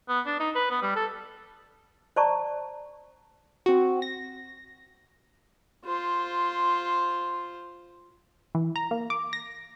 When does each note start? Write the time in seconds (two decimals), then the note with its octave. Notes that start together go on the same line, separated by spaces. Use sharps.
0.09 B3
0.27 D4
0.40 D#4
0.55 B4
0.70 B3
0.82 G3
0.96 A4
2.16 C5 D5 A5 A#5 C#6
3.66 C4 F#4
4.02 A#6
5.85 F4 C5
8.55 E3
8.76 A#5
8.91 A#3
9.10 D6
9.33 A#6